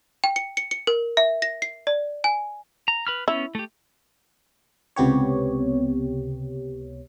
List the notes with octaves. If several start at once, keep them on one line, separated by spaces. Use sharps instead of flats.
G5
C#7
C#7
C#7
A#4
E5
A#6
C7
D5
G#5
A#5
B4 B5 F6
B3 C#4 E4
A3 G4
C#2 C3 B3 G4 C#5